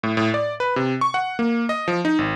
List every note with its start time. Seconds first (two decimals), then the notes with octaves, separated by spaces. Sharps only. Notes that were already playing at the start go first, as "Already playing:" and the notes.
0.03 A2
0.17 A2
0.34 D5
0.60 B4
0.76 C3
1.01 C#6
1.14 F#5
1.39 A#3
1.69 D#5
1.88 F3
2.05 D#4
2.19 G#1